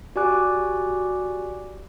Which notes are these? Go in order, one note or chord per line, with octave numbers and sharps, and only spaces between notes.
F#4 G4 D5 G#5 D6 F#6